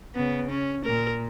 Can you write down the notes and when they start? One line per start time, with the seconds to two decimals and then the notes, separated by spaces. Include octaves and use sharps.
0.15 C#3 B3
0.51 C#4
0.84 A#2 A#4